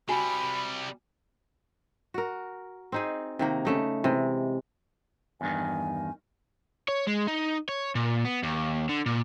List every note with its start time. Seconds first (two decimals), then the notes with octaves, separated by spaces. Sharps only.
0.09 C3 G3 F#4 G#5 B5
2.14 F#4 A#4
2.92 C4 D#4 G#4
3.39 C3 D#3 A#3
3.65 C#3 A3 D#4
4.04 C3 E3 G#3
5.41 E2 G2 D#3 G#5
6.89 C#5
7.07 G#3
7.28 D#4
7.69 C#5
7.95 A#2
8.25 B3
8.43 D#2
8.89 D3
9.06 A#2